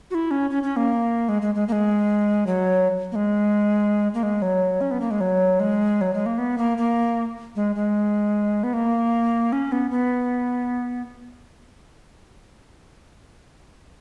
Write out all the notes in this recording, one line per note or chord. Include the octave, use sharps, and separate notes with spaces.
F#4
E4
C#4
C#4
C#4
A#3
G#3
G#3
G#3
A#3
G#3
F#3
A#3
G#3
A#3
G#3
F#3
C#4
B3
A#3
G#3
F#3
G#3
F#3
G#3
A#3
B3
A#3
A#3
G#3
G#3
B3
A#3
C#4
B3
B3